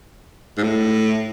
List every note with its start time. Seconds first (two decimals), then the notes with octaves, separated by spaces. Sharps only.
0.57 G#2
0.63 A2